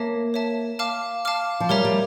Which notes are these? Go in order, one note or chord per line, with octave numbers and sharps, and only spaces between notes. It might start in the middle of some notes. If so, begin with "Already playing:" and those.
Already playing: A#3 C#5 E5 A5
C#5 E5 A5
F5 A5 D6 F6
F5 A5 D6 F6
F3
G3 A#4 C#5 E5 A#5
G3